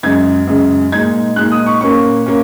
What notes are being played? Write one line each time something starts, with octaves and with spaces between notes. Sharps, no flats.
F#2 C#3 G#3 G#6
F#2 C#3 G#3
A#2 G#3 D#4 G#6
A#2 G#3 D#4 F#6
D#6
C#6
A#2 A#3 C#4 C#6
A#3 C#4